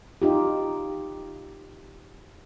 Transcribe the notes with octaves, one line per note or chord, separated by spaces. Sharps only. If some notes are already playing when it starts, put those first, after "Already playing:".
D#4 F4 G4